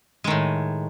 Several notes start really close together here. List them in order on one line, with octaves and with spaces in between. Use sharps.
G#3 D#3 A2